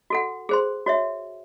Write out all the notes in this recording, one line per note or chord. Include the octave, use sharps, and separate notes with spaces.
F#4 A4 F#5
G#4 C5 C6
F#4 C#5 E5